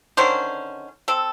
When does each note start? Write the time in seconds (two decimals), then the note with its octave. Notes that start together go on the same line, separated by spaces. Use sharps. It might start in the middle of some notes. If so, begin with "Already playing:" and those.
0.17 D3 D#3 C#4 C5
1.08 C4 A4